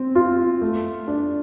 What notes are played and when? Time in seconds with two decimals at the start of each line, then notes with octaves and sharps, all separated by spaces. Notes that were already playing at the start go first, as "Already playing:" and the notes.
Already playing: C4
0.15 F4
0.61 A3
1.07 D4